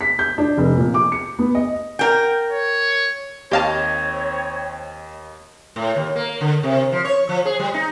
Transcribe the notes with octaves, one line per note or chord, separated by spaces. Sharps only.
B6
G6
D4
F1
A#2
D6
C#7
B3
D#5
A#4 G5
C#5
D#2 C4 G4 C#5 D#5 F5 A5 A#6
A2
D#2
A#3
D3
C3
F3
C#5
F3
G#4
G3
D#4